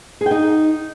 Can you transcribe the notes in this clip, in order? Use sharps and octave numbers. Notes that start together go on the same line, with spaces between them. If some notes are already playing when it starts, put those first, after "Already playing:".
G#4
G5
D#4